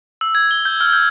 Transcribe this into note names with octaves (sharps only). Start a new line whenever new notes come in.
E6
G#6
G7
G6
F6
G6